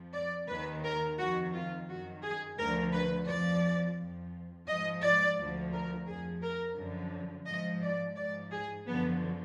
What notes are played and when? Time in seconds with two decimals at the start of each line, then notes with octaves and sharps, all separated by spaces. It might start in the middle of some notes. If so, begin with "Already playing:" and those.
Already playing: F2 F3
0.13 D5
0.48 D#2 D#3 B4
0.83 A#4
1.18 F2 D#3 F#4
1.53 F4
1.88 F#2 D#3 F#4
2.23 G#4
2.58 D2 D3 F3 A#4
2.92 B4
3.27 F2 F3 D5
3.97 F2 F3
4.67 G#2 F3 D#5
5.02 D5
5.38 D2 D3 F3
5.72 A#4
6.06 F2 F3 G#4
6.42 A#4
6.76 F#2 D3 F3
7.46 G#2 F3 D#5
7.81 D5
8.16 G#2 F3 D5
8.51 G#4
8.86 F#2 D3 F3 B3